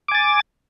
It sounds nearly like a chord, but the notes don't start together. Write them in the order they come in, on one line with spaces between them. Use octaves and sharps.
D6 G#5 A6